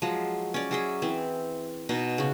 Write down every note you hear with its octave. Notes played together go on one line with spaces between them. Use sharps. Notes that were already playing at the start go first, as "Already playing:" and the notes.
F3 F#3 G#3
C#4 D5
F#3 G#4 E5
E3 C4
B2 D#4
C#3 F#4